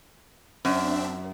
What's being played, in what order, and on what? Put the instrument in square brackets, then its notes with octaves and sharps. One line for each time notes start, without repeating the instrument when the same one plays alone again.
[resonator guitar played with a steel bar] F#2 [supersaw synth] C4 D4 E5